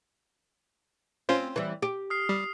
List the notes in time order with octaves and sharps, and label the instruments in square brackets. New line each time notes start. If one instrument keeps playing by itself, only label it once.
[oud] C4 [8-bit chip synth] C#4 F4 C5
[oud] E3 G3
G4
[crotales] D#6 F6 C7
[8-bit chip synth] G3